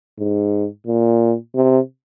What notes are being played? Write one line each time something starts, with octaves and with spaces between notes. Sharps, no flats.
G#2
A#2
C3